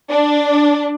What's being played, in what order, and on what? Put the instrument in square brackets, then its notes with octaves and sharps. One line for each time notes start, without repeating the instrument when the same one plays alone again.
[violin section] D4